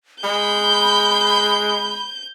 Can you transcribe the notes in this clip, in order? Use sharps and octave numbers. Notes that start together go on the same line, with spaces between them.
G#3 B5 G6